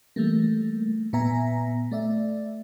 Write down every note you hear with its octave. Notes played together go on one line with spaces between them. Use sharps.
E3 G3 A3 A#3
A#2 B3 E5 G#5 A#5 A#6
A3 D5 E5